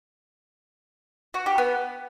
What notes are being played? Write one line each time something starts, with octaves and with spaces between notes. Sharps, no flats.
F#4
G4
B3